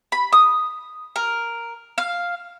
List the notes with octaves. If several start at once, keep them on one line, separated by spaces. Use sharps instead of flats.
B5
D#6
A#4
F5